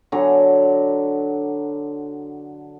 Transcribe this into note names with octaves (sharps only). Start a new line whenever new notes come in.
D3 F#3 G#5 A#5